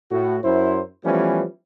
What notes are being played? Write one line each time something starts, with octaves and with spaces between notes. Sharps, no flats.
A2 F#4
F#2 E4 C5
E3 F3 G3 A3 B3 C#4